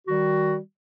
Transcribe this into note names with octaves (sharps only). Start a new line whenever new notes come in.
D#3 G3 F#4